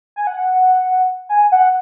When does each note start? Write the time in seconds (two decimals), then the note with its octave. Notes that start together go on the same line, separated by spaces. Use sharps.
0.16 G#5
0.27 F#5
1.29 G#5
1.52 F#5